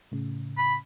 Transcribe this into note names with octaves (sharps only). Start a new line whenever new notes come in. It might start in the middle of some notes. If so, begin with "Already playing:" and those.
A2 C#3
B5